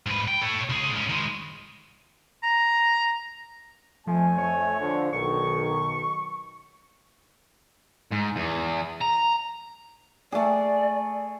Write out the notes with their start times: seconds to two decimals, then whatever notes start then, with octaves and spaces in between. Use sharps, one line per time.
0.06 G#2 B4
0.28 G5
0.42 A4 C#5
0.69 C#2 G#4
0.92 G#2 C#4
1.09 D#3 G#3
2.43 A#5
4.07 F2 F3 A3 G#5
4.38 C#5
4.80 D3 F3
5.13 B1 D#3 C#6
8.12 G#2
8.36 E2
9.01 A#5
10.32 A3 G#4 D5